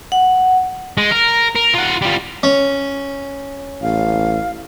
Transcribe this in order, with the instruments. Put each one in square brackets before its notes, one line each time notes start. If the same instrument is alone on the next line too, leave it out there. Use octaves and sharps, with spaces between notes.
[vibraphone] F#5
[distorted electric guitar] G#3
A#4
A#4
F4 F#5
G3 F4
[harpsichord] C#4
[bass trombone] A1 [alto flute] F5